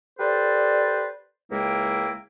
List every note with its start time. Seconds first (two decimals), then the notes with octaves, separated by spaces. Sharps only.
0.19 G4 A4 B4 C5 D5
1.51 C#2 G#3 A#3 E4 G5